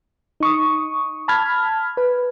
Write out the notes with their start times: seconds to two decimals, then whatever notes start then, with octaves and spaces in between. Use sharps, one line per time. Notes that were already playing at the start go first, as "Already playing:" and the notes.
0.40 D#4 C#6 D#6
1.28 A5 B5 F6 G#6
1.97 B4